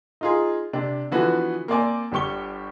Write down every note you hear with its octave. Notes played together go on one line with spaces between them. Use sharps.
D#4 F4 G#4
C3 D4 G4
D3 E3 F3 B3 F#4 B4
A#3 C4 D5 G#5
G1 G3 G4 C#6 G7